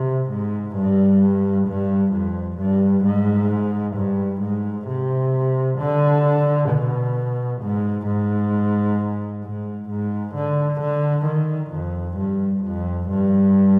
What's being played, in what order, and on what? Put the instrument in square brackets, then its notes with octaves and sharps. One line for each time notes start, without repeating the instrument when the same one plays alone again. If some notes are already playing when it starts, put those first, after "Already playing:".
Already playing: [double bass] C3
G#2
G2
G2
F2
G2
G#2
G2
G#2
C3
D3
B2
G#2
G#2
G#2
G#2
D3
D3
D#3
F2
G2
F2
G2